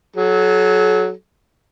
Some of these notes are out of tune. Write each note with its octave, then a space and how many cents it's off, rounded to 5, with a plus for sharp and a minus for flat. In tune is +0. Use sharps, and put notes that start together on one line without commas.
F#3 +0 A4 -45